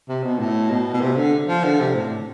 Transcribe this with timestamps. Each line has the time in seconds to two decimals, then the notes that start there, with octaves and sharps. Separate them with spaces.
0.09 C3
0.23 B2
0.39 A2
0.71 B2
0.93 B2
1.01 C3
1.16 D3
1.48 F3
1.64 D3
1.80 C3
1.95 A2